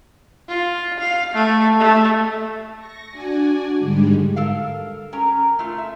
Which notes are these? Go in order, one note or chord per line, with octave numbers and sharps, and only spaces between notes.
F4
F5
A3
A3
C#6 A#6
D4 F#4 D5 G#5
G#2 D3 G3 G#3
A4 A#4 F5
C#4 A#4 A#5
A3 F4
E5